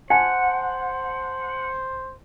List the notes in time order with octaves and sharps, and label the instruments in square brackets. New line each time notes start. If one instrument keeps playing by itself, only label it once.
[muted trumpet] C5 [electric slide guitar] F#5 [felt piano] G#5 A5